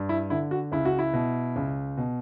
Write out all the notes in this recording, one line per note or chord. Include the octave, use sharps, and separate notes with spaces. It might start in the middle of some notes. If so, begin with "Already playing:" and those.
Already playing: G2
E4
D3 E4
F#4
C#2 E4
F#4
E4
B2
C#2
B2